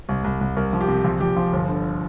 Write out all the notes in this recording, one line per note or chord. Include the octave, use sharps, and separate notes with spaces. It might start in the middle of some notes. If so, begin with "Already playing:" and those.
C2
C2
C2
C2 A#4
F3
G4
C3
A#1 F4
A#1 G4
F3 F4
G1
D3